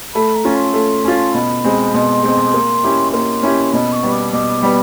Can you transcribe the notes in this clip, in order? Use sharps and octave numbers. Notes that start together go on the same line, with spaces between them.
A3 B5
A#5
C#4 F4
C6
A3
C#4 F4
B2 B5
G#3 C4
B2 C6
G#3 C4
A#3
C#4 E4 G4
A#3 C6
C#4 E4 G4
B2 B5
D6
C#6
G3 B3
D6
B2 D6
G3 B3